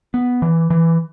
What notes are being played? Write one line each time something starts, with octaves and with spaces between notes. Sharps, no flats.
B3
E3
E3